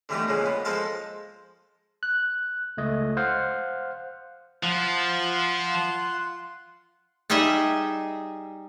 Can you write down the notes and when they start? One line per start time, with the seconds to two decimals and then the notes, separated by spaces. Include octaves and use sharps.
0.09 D3 E3 G3 A3 B3 D#4
0.28 A#2 C#3 F3 G#3
0.46 B3
0.65 F3 G#3 A4 C5 F5 A5
2.03 F#6
2.77 C#2 A3 D#5
3.17 C5 F5 F#5
4.63 F3 F4 F#5 C6
7.30 G3 D#4 G#4 D#5 E5